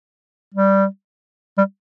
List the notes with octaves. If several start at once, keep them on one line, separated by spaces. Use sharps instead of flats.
G3
G3